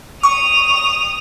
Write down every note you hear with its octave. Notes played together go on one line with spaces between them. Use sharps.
C#6 D#6 F7